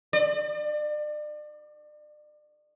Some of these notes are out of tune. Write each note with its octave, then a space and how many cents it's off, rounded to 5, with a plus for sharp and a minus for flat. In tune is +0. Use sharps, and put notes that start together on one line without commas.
D5 +35